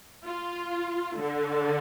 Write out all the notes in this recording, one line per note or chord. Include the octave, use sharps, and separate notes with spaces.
F4
D3